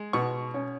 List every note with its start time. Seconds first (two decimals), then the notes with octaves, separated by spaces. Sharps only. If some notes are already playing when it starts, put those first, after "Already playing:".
Already playing: G#3
0.13 B2 C#6
0.54 C#4